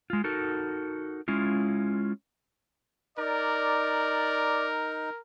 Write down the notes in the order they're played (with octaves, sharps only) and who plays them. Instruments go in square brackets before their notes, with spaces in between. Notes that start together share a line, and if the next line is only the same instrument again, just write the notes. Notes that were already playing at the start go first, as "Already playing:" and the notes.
[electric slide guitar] G#3 F4
D#4 F#4 A4 A#4
G#3 C#4 E4 F4
[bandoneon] D#4 [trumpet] A#4 [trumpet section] D5